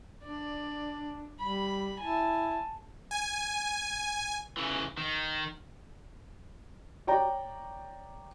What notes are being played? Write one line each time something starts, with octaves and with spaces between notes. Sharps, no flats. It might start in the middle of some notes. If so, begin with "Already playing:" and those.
D4 D5
G3 B5
E4 G#5 A5
G#5
C#3 E3
D#3
C#5 D5 G5 A#5